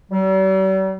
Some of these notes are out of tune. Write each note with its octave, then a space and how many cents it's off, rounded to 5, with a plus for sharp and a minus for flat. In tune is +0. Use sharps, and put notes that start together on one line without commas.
G3 -45